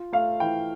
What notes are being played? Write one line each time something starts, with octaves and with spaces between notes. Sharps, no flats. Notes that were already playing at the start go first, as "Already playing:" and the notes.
Already playing: F4
A3 F5
E3 G5